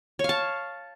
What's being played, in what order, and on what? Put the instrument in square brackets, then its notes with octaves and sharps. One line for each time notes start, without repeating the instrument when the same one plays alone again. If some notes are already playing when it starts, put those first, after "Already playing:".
[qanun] C#5
F5
A5